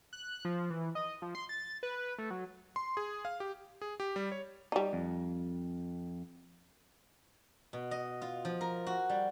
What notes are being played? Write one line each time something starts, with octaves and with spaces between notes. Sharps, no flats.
F#6
F3
E3
D#5
F3
C6
A6
B4
A3
F#3
C6
G#4
F5
G4
G#4
G4
G3
C#5
G3 D#4
F2
B2
D#5
F4
F3
A#4
F#4
G3